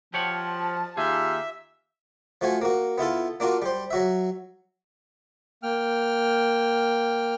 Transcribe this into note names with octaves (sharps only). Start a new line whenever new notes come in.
F3 G4 C#5 F#5 A5
D#2 D#4 F4 G4 G#4 E5
F3 A3 F#4 G#5
A#3 F#4
B3 E4 F4 A4
A#3 D4 F4 F#4
G3 C5
F#3 F#4 E5
A#3 G5 F6